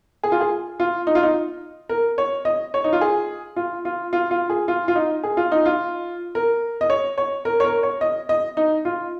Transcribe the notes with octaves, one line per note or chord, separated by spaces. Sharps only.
G#4
F4
G#4
F4
D#4
F4
D#4
A#4
C#5
D#5
C#5
D#4
F4
G#4
F4
F4
F4
F4
G#4
F4
F4
D#4
G#4
F4
D#4
F4
A#4
D#5
C#5
C#5
A#4
C#5
A#4
C#5
D#5
D#5
D#4
F4